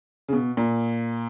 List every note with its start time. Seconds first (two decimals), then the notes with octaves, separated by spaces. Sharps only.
0.28 C#3
0.33 B2
0.57 A#2